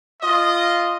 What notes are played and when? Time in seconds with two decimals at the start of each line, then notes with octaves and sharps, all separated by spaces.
0.22 F4 D#5